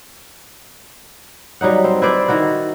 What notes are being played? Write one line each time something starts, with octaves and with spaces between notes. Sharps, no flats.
F#3 G3 D#4 F#5
C4
E4 B4 C5 D5
D#3 E4 F#4